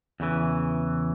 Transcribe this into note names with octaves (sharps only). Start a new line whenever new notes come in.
E2 C#3 E3